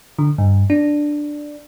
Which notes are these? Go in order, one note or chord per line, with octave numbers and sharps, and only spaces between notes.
D3
G2
D4